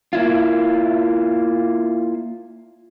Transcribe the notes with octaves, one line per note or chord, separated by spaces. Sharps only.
A#3 E4 F4